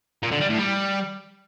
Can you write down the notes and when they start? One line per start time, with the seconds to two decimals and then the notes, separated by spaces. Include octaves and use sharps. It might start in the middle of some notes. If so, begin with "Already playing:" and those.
0.23 A#2
0.32 D3
0.40 G3
0.49 A2
0.58 G3